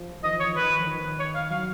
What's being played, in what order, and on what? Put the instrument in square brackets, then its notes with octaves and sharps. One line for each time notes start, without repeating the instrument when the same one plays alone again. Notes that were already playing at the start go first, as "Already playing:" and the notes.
Already playing: [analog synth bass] F3
[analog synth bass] D#3 [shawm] D#5
[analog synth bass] F3
[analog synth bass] D#3 [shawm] C#5
[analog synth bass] F3
[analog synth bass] D#3 [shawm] B4
[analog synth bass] F3
D#3
[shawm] C#5
F5
[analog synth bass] F#3 [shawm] F5